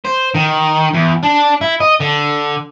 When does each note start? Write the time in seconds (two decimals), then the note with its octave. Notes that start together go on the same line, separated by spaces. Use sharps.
0.05 C5
0.35 D#3
0.94 E2
1.23 D4
1.61 E4
1.80 D#5
2.00 D3